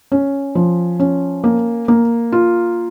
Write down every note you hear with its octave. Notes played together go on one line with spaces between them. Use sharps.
C#4
F3
C#4
A#3
A#3
F4